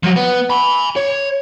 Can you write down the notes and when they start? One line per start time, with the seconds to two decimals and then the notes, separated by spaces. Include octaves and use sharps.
0.04 F3 F#3
0.17 B3
0.50 G#5 B5
0.97 C#5